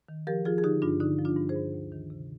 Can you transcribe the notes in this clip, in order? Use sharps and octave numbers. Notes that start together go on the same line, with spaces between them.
D#3
F3 G4 A#4
F3 F4 G#4
G#4
D3 D#4 G4
G2 D4 F4
D3 D#4
F3
D4 F4
G2
G#4 C5
G2
D2
D#3
C3